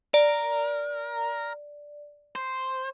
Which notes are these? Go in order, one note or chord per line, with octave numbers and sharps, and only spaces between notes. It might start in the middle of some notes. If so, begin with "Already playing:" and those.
A#4 D5
C5